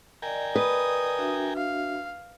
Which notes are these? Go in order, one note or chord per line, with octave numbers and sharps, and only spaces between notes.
A#4 D5 D#5 G5 G#5
B4 D#6
D4 F#4 E5
F5